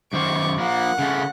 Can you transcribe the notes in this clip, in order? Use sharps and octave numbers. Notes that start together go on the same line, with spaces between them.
F#2 D#3 C5 C#6 D6
F3 A#3 F#5
C#3 A3 C#4